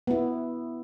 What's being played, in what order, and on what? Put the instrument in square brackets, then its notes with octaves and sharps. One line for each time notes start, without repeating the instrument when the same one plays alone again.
[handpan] B3 E4